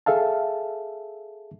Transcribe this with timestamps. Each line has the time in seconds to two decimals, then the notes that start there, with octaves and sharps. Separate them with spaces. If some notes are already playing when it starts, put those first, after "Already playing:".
0.06 G#4 A4 E5 F5 A5